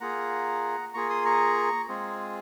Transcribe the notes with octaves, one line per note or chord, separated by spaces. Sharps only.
A#3 F4 G#4 F#5 A#5
A#3 F4 G#4 A#5 C#6
C6 D#6
A#5 C#6
G#3 C4 F4 G#4